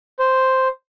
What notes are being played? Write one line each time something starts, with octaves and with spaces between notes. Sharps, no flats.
C5